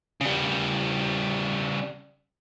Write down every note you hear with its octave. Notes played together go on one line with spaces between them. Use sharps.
C#3 G3